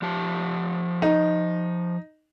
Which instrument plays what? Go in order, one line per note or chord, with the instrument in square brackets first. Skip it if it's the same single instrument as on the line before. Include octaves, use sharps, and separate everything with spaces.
[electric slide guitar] F3 G4 A5
[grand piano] D#4